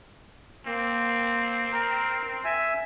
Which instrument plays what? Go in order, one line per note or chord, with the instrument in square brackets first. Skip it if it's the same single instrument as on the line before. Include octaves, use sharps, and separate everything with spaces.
[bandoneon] A#3 [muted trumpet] C4
[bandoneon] A#4 A#5
E5 G#5 E6